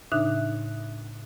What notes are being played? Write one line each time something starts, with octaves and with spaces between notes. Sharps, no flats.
A2 C#3 D4 D#4 E5 F#6